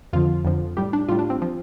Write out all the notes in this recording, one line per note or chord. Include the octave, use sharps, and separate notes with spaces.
F2 D3 F3 F4
F2 D3 F3
A2 G3 G4
D4
A2 G3 F4
D4
C4
F3